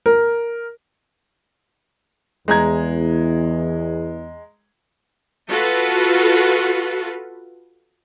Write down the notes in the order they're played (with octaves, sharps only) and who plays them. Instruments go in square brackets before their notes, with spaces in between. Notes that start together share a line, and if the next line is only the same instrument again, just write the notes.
[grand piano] A#4
[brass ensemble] E2 [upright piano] G#3 A#5 G#6
[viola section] F4 F#4 A4 B4